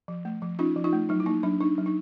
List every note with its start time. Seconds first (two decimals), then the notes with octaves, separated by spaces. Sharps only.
0.08 F3
0.25 A3
0.42 F3
0.59 C#4 D#4 F4
0.76 F3
0.84 D#4 F4
0.93 A3
1.09 F#3 D#4
1.20 E4
1.26 A#3 D#4
1.43 F#3 D4
1.60 D4 D#4
1.78 F#3
1.86 D#4